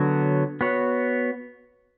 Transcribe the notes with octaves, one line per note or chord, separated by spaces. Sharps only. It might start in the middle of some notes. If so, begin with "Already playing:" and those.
Already playing: D3 F#3 B3 F#4 C#5
B3 F#4 C#5